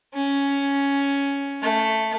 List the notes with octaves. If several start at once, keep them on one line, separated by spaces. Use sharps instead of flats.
C#4
A3